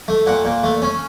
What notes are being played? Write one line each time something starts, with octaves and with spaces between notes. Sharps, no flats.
A3
A#2 F#5
A#2
A3
C#4